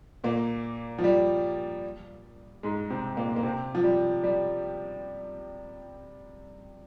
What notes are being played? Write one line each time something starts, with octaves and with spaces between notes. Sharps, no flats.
A#2 A#3
F3
G3
G#2 G#3
C3 C4
A#2 A#3
A#3
C3 C4
F3
G3
G3